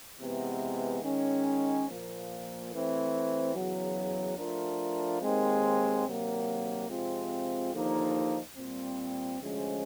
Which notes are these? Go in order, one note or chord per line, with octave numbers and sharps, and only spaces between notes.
C3 E3 G#3 B3
D#3 G#3 C#4
A#2 F3 A#3
E3 A3 C4
E2 C#3 F#3
F3 A3 D4 F4 A#4
D#2 D#3 G#3 C4
C3 D#3 F#3 A#3
C3 F3 G#3 C4 F4
D#2 D3 F3 A#3 D#4
A#2 G3 C4
D2 C3 F3 G#3 C#4